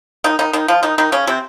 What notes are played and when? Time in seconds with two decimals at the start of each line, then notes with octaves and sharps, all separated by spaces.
0.24 D#3 D#4
0.39 D#3 D#4
0.53 D#3 D#4
0.68 F3 F4
0.83 D#3 D#4
0.98 D#3 D#4
1.12 C#3 C#4
1.27 C3 C4